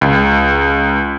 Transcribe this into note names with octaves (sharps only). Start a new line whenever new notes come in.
C#2